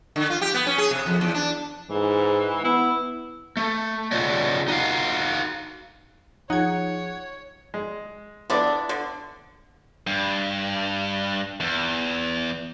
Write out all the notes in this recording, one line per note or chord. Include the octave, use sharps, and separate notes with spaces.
D3
F4
G4
B3
C#4
G#4
C3
F2
E2
D4
G#2 E3
B3 E4
A3
C#3 A#3 F4 F#4 D5 D#5
D#4 F#4 F5
F3 D#4 F4 G#4 C#5 F#5 G#6
G#3
D3 B3 D4 E4 D5
D3
G2
E2